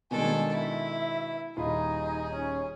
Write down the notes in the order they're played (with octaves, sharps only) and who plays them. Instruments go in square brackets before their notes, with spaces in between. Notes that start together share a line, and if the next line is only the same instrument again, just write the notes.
[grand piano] B2 D#3 G#3 [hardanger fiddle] D4 A4 [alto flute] G#5
[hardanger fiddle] E4 [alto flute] E5
[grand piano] D#1 F4 B5 [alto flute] D#4 [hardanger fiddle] G#4
[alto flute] C#4